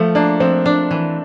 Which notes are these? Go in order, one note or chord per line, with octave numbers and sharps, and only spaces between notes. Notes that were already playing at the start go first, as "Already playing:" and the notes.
Already playing: F3 A3
A#3 D4
F3 C4
D4
E3